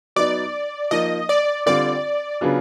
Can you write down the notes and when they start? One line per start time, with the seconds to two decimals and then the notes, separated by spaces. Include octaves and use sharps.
0.16 F#3 B3 D#4 D5
0.91 F3 A#3 D#4 D#5
1.29 D5
1.66 D3 G3 C4 F4 D5
2.41 C#3 F#3 B3 D4 F4